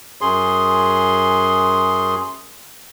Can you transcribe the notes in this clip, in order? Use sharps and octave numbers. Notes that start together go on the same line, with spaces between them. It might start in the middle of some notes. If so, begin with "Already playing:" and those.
F#2 G#4 C6